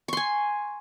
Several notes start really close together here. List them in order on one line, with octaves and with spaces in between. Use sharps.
C#6 C6 G#5